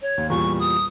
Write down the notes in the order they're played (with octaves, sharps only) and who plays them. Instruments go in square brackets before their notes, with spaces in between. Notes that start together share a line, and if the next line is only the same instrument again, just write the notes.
[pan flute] C#5
[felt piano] D#2
[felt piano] E2 A#2 G3 [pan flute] C#6
[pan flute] D#6